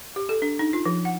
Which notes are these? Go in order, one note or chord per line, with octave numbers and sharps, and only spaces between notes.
G4
A4
D4
D#4
F4
F3
F#5